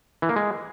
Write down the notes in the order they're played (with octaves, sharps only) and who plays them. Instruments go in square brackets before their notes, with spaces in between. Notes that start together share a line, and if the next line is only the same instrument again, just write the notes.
[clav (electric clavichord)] E3
A#3
G#3